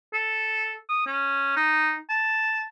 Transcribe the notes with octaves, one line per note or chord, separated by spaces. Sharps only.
A4
D#6
C#4
D#4
A5